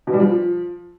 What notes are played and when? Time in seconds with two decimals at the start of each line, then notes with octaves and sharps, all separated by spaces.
0.07 B2
0.13 G3
0.20 F3